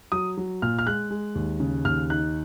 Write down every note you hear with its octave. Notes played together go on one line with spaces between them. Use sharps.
F#3 D#6
F#3
A#2 F6
F6
G#3 F#6
G#3
D#2
C#3
D#2 F6
D#4 F#6